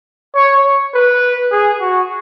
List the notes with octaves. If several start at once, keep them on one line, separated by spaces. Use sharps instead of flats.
C#5
B4
G#4
F#4